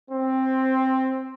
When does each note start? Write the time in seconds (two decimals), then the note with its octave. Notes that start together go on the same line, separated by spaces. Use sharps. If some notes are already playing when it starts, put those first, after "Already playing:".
0.11 C4